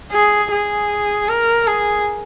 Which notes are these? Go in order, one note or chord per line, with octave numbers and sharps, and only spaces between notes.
G#4
G#4
A#4
G#4